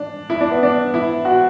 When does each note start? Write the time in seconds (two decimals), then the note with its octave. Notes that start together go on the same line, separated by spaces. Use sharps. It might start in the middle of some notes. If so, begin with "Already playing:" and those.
Already playing: D4
0.30 E4
0.41 D4
0.51 B3
0.63 D4
0.94 E4
1.25 F#4